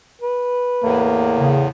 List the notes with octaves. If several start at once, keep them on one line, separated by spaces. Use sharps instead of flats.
B4
E2 A2 A#3
C#3